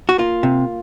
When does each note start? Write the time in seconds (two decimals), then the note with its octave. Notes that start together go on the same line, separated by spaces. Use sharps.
0.09 F#4
0.18 A#3 F4
0.43 C3